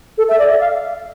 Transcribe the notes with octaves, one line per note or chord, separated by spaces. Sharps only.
A4
E5
D5
E5
F5